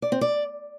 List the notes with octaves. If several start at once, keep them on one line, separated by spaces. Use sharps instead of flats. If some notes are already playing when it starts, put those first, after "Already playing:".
D5
C4
D5